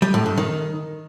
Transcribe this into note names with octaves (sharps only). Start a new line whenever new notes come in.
G3
A2
G2
D#3